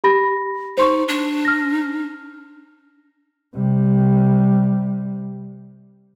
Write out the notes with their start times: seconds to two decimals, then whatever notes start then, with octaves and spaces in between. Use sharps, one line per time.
0.04 G4 B5 A#6
0.77 D#4 C5 C6 C#6
1.08 D4
1.45 F6 A#6
3.55 C3 G3